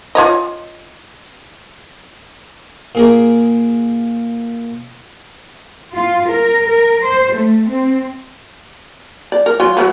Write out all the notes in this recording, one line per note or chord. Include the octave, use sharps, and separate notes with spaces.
F4 C#5 D#5
A#2 G#4 A#4
F4
A#4
A#4
C5
A3
C4
D5
A#4
F#3 F4 G#5
F#3 A#3 B3